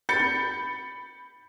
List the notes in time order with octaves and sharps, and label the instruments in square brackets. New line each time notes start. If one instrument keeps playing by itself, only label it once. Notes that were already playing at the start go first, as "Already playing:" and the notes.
[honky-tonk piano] B5 G6 A6 C#7